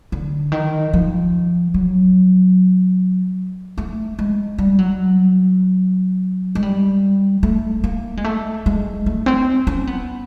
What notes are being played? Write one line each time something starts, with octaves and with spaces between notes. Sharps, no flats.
D3
D#3
F3
F#3
A3
G#3
G3
F#3
G#3
G3
A3
A#3
G#3
A3
G#3
A3
C4
C#4
B3